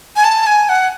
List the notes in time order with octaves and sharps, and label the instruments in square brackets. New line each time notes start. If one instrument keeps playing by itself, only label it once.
[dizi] G#5
A5
G#5
F#5